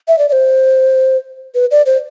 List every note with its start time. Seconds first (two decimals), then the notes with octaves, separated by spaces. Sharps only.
0.08 E5
0.19 D5
0.29 D5
0.32 C5
1.55 B4
1.71 D5
1.86 C5